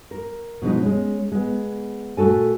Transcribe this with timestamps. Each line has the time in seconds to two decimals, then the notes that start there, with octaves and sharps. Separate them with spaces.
0.11 A#4
0.62 B2 F3 G#3 D#4
0.82 G#3 C#4
1.32 G#3 B3
2.17 A#2 A3 F#4 A4 G#5